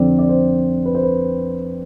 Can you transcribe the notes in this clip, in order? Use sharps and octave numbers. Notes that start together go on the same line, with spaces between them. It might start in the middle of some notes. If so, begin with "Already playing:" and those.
Already playing: F2 D3 F3 C4 D5
D5
C5
B4
C5
B4